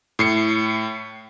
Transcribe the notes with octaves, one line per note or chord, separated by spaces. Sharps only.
A2 C7 C#7